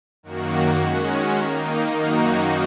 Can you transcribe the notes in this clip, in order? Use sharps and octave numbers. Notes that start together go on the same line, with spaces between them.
F#2 D#3 A#3 F#4
D#3 G#3 C#4 F#4
D#3 A#3 D#4
F#2 D#3 A#3 D#4 F#4